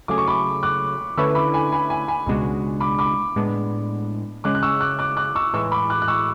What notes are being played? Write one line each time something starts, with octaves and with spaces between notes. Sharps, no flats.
C#3 F#3 A3 C#4 G#4 D6
C#6
B5 D6
D6 F#6
D3 A3 C#4 E4 B4 C#6 E6
B5 D6
G#5 B5
G#5 B5
G#5 B5
G#5 B5
C#2 B2 G#3 D4 F#4
B5 D6
B5 D6
A2 G#3 B3 D4
C#3 G#3 C#4 D6 F#6
F#6
C#6 E6
D6 F#6
D6 F#6
D6 F#6
C#6 E6
A2 E3 G#3 C#6 E6
B5 D6
D6 F#6
F#6
C#6 E6